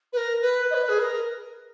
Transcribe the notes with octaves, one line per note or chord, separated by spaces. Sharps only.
B4
A#4
B4
D#5
B4
G#4
B4
A#4